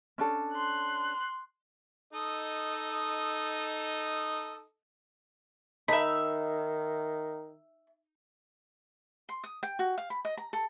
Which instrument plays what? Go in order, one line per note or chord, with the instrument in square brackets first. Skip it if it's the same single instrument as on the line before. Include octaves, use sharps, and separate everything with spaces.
[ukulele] C#4 D4 A4
[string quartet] C6 F#6
[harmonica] D#4 A4 D#5
[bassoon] D#3 [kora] D#4 [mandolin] E5 B5
[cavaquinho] C6
D#6
G5
F#4
F5
B5
D#5
A#5
A4